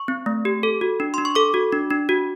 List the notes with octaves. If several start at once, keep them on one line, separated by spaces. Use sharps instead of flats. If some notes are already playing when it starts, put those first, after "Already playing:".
Already playing: C#6
C4
A3
G4
A4
F#4
D4
D4 C6
C#6
A4 D6
F#4
D4
D4
F#4